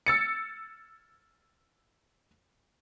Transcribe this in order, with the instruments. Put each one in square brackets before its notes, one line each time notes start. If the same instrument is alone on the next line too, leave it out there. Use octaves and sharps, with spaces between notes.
[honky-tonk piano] E6 A6 C#7